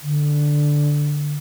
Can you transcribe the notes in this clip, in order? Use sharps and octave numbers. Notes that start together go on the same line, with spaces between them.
D3